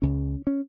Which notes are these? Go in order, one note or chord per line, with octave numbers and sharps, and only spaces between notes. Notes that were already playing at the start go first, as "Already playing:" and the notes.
C#2 C#3 C#4
C#4